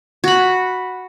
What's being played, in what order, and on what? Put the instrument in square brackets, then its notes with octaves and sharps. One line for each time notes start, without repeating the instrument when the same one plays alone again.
[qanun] F#4 B5